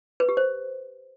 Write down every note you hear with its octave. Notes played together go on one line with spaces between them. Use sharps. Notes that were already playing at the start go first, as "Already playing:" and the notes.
B4
G4
C5